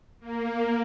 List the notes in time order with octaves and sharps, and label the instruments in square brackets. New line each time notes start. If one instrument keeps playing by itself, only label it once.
[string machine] A#3